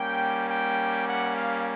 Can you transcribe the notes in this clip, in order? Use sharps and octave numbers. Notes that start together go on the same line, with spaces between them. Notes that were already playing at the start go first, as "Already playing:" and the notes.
Already playing: G3 A#3 C#4 G5
G5
F#5
F5